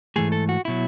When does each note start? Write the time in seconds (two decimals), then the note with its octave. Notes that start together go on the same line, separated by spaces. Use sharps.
0.16 G#2 E3 A3 G#4
0.32 A4
0.49 F#4
0.65 B2 F#3 E4